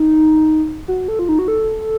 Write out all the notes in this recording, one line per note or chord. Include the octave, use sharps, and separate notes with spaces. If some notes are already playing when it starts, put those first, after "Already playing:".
Already playing: D#4
F#4
A4
F4
D#4
F#4
A4